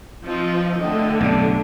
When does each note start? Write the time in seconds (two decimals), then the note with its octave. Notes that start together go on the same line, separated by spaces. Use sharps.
0.24 F3 C4 D#4
0.81 D3 A3 D#5 G5
1.21 B1 G2 C#3 D4